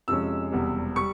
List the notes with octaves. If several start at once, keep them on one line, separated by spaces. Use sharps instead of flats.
F2 C3 F3 G#3 C#4 E6
E1 E2 C3 G3
G3 C#6